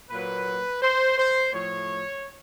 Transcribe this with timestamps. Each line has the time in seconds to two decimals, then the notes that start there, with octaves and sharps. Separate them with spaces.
0.11 A#2 F#3 A#3 B4
0.82 C5
1.18 C5
1.53 A2 F3 A3 C#5